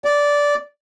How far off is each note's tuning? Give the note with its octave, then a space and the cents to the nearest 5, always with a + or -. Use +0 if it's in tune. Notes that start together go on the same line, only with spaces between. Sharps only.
D5 -10